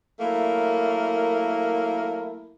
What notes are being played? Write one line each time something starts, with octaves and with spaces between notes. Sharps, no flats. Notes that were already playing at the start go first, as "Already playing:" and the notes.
F#3 A3 A#3 E4 A#4